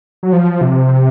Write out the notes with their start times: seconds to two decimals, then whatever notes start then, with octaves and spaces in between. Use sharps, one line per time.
0.23 F#3
0.33 F3
0.61 C3